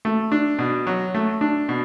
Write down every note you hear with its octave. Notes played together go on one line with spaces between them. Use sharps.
A3
D4
B2
F#3
A3
D4
B2